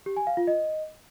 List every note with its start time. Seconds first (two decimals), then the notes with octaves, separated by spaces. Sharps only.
0.06 G4
0.17 G#5
0.27 F5
0.37 F4
0.47 D#5